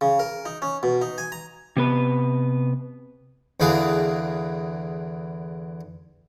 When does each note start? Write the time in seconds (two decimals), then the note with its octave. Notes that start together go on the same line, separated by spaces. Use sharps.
0.01 C#3
0.19 A#4
0.45 D#4
0.62 C#4
0.83 B2
1.02 D#4
1.18 G#5
1.32 A#5
1.77 C3 B3 B4
3.60 E2 D3 E3 G#4 F5